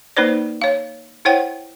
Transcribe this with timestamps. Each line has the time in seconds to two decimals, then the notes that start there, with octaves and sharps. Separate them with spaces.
0.17 A#3 D#4 B4 C5 D5
0.62 C#5 F5
1.25 E4 C5 C#5 F#5 G5